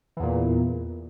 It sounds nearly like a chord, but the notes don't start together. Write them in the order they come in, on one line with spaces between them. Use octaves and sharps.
E3 E2 A#2